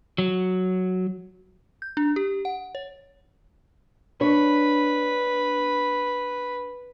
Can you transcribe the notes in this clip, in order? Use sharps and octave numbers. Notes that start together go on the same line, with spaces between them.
F#3
G6
D4
G4
F#5
C#5
D4 B4 C#5 B5